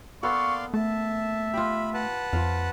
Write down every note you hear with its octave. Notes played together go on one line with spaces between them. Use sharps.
A#3 B3 A4 D5 F5 C6 C#6
A3 E5 A5
F4 G4 B5
B4 F#5 A5
F2 F3 F5